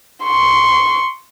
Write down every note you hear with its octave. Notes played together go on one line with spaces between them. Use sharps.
C6 C#6